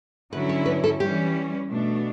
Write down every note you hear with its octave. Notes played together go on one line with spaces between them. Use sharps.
D3 F#3 C#4 E4 B4
C#5
B4
A4
E3 G3 C#4 G4
B2 A3 D4